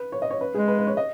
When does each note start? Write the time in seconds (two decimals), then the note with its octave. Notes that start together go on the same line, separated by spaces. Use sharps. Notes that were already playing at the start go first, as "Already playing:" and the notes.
Already playing: B4
0.12 C#5
0.22 D#5
0.31 C#5
0.41 B4
0.54 G#3 G#4
0.68 B4
0.78 B4
0.87 C#5
0.97 D#5